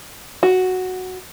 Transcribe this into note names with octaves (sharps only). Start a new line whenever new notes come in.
F#4